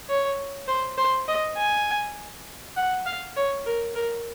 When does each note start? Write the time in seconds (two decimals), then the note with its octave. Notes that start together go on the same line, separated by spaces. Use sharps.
0.09 C#5
0.68 C5
0.98 C5
1.28 D#5
1.57 G#5
2.76 F#5
3.06 F5
3.36 C#5
3.66 A#4
3.95 A#4